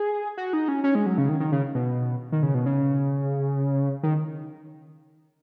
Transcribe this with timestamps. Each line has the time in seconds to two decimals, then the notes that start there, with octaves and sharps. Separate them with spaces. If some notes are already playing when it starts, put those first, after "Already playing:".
Already playing: G#4
0.38 F#4
0.53 D#4
0.68 C#4
0.84 C#4
0.95 G#3
1.06 F#3
1.18 C#3
1.29 D#3
1.40 D#3
1.52 C#3
1.75 B2
2.32 D#3
2.43 C#3
2.54 B2
2.66 C#3
4.03 D#3